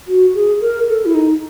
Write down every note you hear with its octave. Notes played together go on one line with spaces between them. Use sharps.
F#4
G#4
A#4
A4
E4
D#4